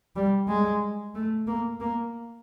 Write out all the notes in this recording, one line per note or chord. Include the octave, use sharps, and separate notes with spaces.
G3
G#3
A3
A#3
A#3